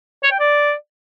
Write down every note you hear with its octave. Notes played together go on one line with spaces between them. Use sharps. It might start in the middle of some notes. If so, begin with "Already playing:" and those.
C#5
G5
D5